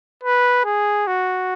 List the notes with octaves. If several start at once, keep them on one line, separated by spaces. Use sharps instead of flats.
B4
G#4
F#4